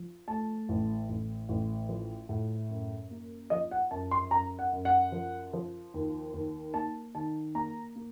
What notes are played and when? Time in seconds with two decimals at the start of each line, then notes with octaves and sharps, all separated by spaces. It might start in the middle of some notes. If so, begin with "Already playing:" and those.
Already playing: F3
0.28 A3 A5
0.69 A1
1.09 A1
1.49 A1
1.89 F3
2.29 A2
2.70 F#2
3.11 A#3
3.50 F3 D#5
3.71 F#5
3.91 F#2 A5
4.11 C6
4.31 F#2 A#5
4.59 F#5
4.72 F#2
4.85 F#5
5.12 F3
5.53 F3
5.94 D#2
6.33 D#2
6.74 A#3 A5
7.15 D#3 A5
7.55 A#3 A#5
7.96 A#3